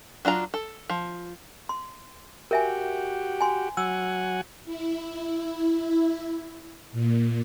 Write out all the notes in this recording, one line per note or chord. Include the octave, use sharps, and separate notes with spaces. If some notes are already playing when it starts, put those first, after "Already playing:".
F#3 D4 F4 A#5
A4
F3
C6
F#4 G4 A#4 E5 G#5
G#5 C6
F#3 F#5 G#5 E6
E4
A#2